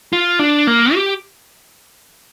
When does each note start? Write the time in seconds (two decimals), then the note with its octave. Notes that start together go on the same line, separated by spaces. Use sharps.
0.13 F4
0.39 D4
0.67 A#3
0.94 G4